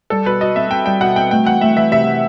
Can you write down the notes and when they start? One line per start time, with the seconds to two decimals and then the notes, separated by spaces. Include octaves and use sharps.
0.10 G3 A4
0.26 B2 B4
0.41 F#4 D#5
0.56 C4 E5
0.71 C4 G5
0.86 G3 G5
1.01 B2 F#5
1.16 C4 G5
1.31 A3 G5
1.46 E3 F#5
1.61 A3 E5
1.76 E3 E5
1.91 C3 E5
2.07 E3